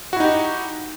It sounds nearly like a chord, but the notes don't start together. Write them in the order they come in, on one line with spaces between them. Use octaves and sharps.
F#4 E4 D#4 G4